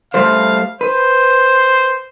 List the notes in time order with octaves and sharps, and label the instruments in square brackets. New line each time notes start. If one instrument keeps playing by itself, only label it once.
[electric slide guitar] G3 A3 C5 [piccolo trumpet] F5
[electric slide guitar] B4 [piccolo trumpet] C5